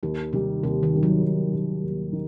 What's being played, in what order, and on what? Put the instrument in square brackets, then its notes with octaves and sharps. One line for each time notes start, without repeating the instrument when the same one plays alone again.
[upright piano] D#2 [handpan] D#3
[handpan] C3 [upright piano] D#3 G3
[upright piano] D#2 [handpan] C3
[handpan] D#3
[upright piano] D#3 G3
[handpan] F#3
[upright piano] D#2
D#3 G3
D#2
D#3